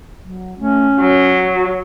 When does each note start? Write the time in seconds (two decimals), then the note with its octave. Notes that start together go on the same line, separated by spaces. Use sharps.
0.25 F#3
0.59 A3 C#4
1.00 F#3 F#4